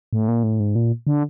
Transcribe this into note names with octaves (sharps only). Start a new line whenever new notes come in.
A2
A#2
A2
G#2
A#2
D3